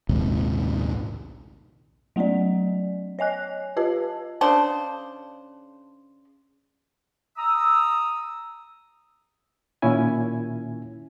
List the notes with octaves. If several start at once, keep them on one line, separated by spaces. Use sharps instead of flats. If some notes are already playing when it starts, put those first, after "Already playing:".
A#1 D#2 G#2 C3
F#3 A3 B3 C#4 D5
C#5 D#5 G#5 F#6
F4 G4 B4 D#5 A5
C#3 D4 C5
A#5 D#6 E6
A#2 D#3 C#4 E4 G#5